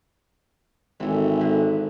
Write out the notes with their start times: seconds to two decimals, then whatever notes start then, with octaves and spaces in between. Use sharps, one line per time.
1.00 G#1 E3 A4
1.41 D3 B4